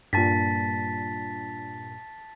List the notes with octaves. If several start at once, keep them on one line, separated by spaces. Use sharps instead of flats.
G2 A#2 A5 A6 B6